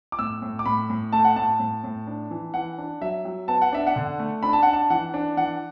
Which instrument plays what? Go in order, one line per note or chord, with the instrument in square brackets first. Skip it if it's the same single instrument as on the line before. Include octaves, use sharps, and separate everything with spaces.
[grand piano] D6
A2 E6
A2
D6
A2 B5
A2
A3 A5
F#5
A2 A5
A2
A2
D4
E3
E3 F#5
D4
F#3 E5
F#3
B3 A5
F#5
D4 E5
F#5
D3
A3
D4 B5
A5
D4 F#5
A5
E3 F#5
D4
E3 F#5